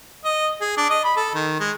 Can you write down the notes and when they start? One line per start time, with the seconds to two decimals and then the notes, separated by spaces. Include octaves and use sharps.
0.25 D#5
0.61 G#4
0.78 D4
0.90 D#5
1.04 B5
1.16 A4
1.34 D#3
1.60 G#3